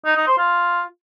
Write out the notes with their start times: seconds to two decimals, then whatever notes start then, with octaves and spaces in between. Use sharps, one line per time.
0.05 D#4
0.16 D#4
0.27 C5
0.38 F4